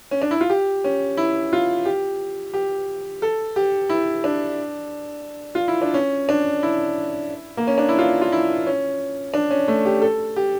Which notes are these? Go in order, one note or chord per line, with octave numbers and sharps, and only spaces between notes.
C#4
D4
E4
F4
G4
C#4
E4
F4
G4
G4
A4
G4
E4
D4
F4
E4
D4
C#4
D4
E4
A#3
C#4
D4
E4
F4
F4
E4
C#4
D4
C#4
A3
G4
A4
G4